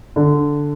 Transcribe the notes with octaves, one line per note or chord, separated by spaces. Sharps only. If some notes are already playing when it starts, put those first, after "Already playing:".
D3